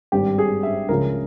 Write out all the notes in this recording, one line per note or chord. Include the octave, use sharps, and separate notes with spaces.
G#1 G2 G3 G4
G#4
E5
C#2 C#3 F3 G#3 A#4